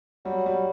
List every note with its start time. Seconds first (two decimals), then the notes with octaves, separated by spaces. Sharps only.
0.25 F#3 G3
0.46 G3